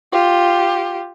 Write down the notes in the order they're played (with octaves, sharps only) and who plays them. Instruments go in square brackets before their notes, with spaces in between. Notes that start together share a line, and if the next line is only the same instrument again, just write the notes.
[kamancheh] F4 G4